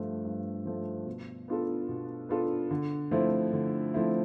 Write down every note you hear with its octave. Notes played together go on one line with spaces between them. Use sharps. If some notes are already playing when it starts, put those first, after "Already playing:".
Already playing: G2 F3 A3
G2
F3 A3
B2
B3 D4 F4 A4
B2
B3 D4 F4 A4
D3
F3 A3 C4 E4
D3
F3 A3 C4 E4